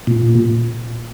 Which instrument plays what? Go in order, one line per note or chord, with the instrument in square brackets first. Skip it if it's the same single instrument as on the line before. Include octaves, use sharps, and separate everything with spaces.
[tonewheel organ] A#2